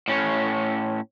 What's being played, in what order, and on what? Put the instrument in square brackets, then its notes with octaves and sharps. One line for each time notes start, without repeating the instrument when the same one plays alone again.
[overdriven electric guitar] A2 C#4